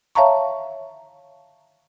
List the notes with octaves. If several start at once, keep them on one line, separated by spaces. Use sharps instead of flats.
C#5 E5 F5 A5 A#5 C#6